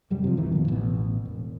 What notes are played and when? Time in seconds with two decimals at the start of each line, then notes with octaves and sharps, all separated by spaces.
0.10 F1 F#2 G3
0.24 C3 F3
0.37 D1 D#3 E3
0.52 F2 B2
0.67 A1 B2
1.25 E1